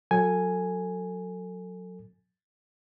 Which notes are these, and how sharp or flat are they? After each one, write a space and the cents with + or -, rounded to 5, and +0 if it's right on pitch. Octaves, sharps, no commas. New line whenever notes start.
F#3 -20 A4 +25 G#5 +0